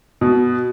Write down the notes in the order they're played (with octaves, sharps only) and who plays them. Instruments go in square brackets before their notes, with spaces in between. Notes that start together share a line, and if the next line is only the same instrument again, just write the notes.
[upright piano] B2